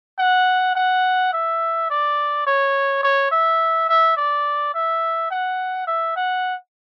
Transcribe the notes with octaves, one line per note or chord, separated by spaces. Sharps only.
F#5
F#5
E5
D5
C#5
C#5
E5
E5
D5
E5
F#5
E5
F#5